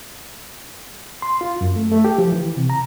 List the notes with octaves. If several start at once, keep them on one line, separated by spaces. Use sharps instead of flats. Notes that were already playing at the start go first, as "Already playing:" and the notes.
C6
F4
F#2
A3
A3
G4
F3
E3
C3
A#5